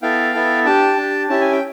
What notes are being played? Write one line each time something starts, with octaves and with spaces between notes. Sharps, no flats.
B3 E4 A4 F5 G5
B3 E4 A4
D4 G4 G5 A5
D4 G4
C#4 E4 G4 A5
G#5
G5